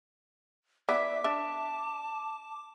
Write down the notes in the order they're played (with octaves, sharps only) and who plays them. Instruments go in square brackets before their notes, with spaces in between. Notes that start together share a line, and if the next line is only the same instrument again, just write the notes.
[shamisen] B3 E4 [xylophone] D5 E6 [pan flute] E5 [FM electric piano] D6 B6
[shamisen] D4 E5 [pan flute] A5 [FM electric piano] D6